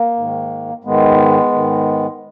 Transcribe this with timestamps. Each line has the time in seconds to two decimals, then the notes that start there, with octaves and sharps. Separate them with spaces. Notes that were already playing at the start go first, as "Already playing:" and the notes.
Already playing: A#3
0.17 G#2 D#3
0.84 G#2 D#3 G#3 B3
1.53 G#2 D#3